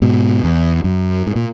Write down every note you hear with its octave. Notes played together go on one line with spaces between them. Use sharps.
G#2 B2
E2
F#2
G#2
A#2